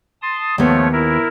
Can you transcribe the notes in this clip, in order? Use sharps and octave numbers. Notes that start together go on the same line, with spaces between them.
A5 C6 D#6
D#2 F3 A3 B3 C#5
E4 A#4